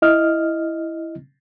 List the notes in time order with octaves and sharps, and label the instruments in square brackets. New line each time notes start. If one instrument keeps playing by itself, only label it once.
[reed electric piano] E4 D#5 F6